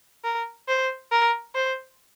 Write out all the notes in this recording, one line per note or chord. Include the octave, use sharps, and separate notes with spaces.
A#4
C5
A#4
C5